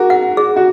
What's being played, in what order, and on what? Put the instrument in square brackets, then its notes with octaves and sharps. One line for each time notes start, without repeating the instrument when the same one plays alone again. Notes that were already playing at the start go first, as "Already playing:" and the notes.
Already playing: [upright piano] F#4 A#4 [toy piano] G#4
[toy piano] F#5
G#4
[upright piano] F#4